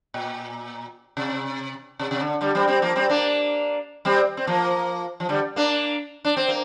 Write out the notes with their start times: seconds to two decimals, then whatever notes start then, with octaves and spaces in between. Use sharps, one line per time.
0.14 A#2
1.17 C3
1.99 C3
2.11 C3
2.20 D3
2.41 D3 G3
2.55 G3 C4
2.68 G3 C4
2.82 F3 A#3
2.96 G3 C4
3.09 A#3 D4
4.05 G3 C4
4.37 C4
4.47 F3 A#3
5.20 F3
5.29 D3 G3
5.56 A#3 D4
6.25 D4
6.37 C4
6.48 A#3